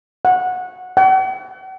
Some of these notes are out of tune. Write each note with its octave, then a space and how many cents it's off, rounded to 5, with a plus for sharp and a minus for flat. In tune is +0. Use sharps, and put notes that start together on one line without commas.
F#5 -15
F#5 +45